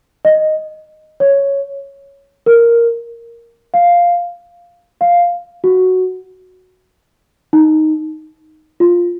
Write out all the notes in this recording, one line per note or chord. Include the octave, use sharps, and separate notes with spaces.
D#5
C#5
A#4
F5
F5
F#4
D#4
F4